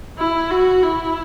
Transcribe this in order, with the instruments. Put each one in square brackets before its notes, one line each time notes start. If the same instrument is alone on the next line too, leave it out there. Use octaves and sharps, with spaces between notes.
[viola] E4
F#4
E4